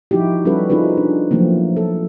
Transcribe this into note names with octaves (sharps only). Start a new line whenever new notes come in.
F3 D#4 E4 F#4 G4
G3 C#4 F#4 A4 B4
C4 C#4 D#4 F4 G#4 B4
D4
F3 F#3 A3 A#3 C4
A4